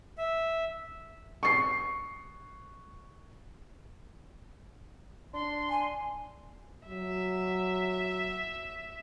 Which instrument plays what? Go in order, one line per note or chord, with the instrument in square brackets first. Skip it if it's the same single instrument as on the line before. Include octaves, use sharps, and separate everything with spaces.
[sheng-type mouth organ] E5
[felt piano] C#6 C7
[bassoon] D4 [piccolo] C6
[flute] G#5
[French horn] F#3 [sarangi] E5